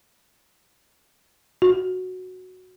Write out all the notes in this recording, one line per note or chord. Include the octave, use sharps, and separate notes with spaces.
F#4